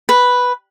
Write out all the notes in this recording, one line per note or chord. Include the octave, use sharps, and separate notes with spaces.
B4